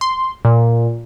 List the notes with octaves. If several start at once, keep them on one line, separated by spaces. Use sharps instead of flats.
C6
A#2